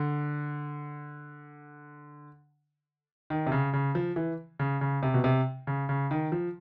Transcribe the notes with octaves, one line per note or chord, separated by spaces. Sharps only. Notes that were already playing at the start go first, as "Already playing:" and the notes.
Already playing: D3
D#3
C3
C#3
C#3
F3
E3
C#3
C#3
C3
B2
C3
C#3
C#3
D#3
F3